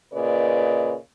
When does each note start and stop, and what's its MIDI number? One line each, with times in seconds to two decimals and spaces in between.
0.13 0.94 46
0.13 0.94 49
0.13 0.94 71
0.13 0.94 74
0.13 0.94 75